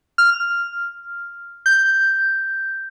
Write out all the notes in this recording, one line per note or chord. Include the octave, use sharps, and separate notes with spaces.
F6
G6